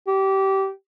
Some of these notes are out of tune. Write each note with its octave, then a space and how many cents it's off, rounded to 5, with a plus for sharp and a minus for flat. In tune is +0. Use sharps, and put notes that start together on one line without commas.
G4 -20